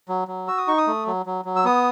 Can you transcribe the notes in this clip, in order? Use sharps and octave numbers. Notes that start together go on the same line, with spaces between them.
F#3
F#3
F#4 E6
D#6
D#4 C#6
D#6
A3
F#3
F#3
F#3
E6
B3 D#6